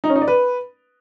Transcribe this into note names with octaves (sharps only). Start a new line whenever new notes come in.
D#4
C#4
D#4
D5
B4